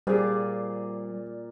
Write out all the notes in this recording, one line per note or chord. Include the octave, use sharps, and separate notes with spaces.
A#2 G3 G4 G#4 C5 D5